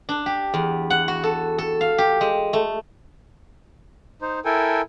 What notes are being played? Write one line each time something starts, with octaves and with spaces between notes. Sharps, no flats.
D4
G4
E2
F#5
F#4
A4
A4
F5
G4
G#3
A3
D#4 C5
E4 A4 A#4 G5 G#5